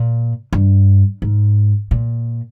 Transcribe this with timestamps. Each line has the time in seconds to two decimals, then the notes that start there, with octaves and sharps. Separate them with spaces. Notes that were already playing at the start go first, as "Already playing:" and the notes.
Already playing: A#2
0.53 G2
1.22 G#2
1.91 A#2